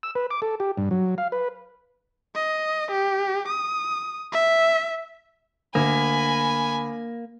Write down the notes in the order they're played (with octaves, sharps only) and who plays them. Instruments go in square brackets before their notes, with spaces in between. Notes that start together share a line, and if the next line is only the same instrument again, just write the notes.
[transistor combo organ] E6
B4
D6
A4
G4
G2
F#3
F5
B4
[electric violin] D#5
G4
D#6
E5
[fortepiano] D2 [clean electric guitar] A#3 [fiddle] G#5 [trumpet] B5